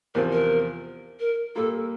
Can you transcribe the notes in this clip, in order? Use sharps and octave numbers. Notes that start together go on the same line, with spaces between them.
E2 C3 F3 C4 F4 A#4
A#4
A#4
A#2 G3 A#3 F4 A4